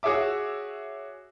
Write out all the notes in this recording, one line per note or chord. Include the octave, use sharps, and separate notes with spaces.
F#4 G#4 C#5 E5 D6